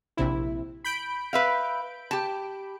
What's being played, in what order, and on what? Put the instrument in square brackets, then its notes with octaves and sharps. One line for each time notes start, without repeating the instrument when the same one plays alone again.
[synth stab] A#1 C3 E4
B5 G6 D7
[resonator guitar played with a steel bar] B4 E5 F5
G4 A5